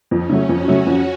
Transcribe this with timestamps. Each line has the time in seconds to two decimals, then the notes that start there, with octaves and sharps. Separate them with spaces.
0.11 F2 C#4
0.30 C#3 F#3 A3
0.49 F2 F#4
0.68 C#3 F#3 A3
0.86 F2